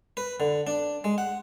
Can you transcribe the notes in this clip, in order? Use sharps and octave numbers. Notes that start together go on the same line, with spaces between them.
B4
D3
D4
G#3
F#5